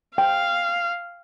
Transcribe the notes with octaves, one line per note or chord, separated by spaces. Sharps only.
F5 G5